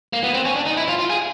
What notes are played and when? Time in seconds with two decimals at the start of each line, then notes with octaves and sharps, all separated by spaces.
0.13 A#3
0.24 B3
0.34 C4
0.45 C#4
0.56 D4
0.66 D#4
0.77 E4
0.88 F4
0.99 F4
1.10 G#4